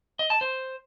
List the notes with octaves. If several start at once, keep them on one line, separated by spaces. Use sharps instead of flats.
D#5
A5
C5